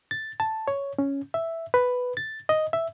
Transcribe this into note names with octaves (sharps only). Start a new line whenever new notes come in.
A6
A5
C#5
C#4
E5
B4
A6
D#5
E5